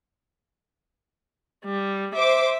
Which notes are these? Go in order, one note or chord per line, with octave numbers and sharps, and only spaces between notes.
G3
C5 E5 D6